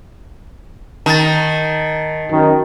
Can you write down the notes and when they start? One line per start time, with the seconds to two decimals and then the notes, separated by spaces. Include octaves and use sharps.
1.06 D#3 A5 A6
2.31 F#2 D#3